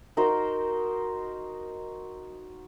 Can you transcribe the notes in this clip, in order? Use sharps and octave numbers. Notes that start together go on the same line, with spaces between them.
D#4 F#4 A#4 C5